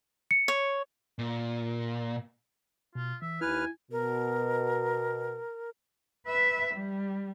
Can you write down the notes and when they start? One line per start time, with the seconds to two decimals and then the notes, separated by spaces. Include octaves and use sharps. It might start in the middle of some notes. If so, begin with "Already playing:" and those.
0.31 C#7
0.48 C#5
1.19 A#2
2.95 B2 F4
3.22 E3 E5
3.41 D#2 E4 B4 G#5 F6
3.92 B2 A#4
6.27 B4 E5
6.74 G3